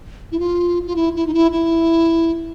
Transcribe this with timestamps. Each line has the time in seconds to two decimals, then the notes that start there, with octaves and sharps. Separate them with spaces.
0.32 E4
0.39 F4
0.87 F4
0.96 E4
1.15 E4
1.27 D#4
1.34 E4
1.52 E4